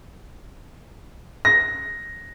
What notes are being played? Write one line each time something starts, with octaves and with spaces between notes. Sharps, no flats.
A#6